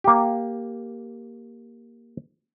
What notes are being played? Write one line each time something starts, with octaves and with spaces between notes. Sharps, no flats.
A#3 G4